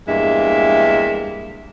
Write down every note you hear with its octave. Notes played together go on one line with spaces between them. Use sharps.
E2 G2 G#3 A#3 E5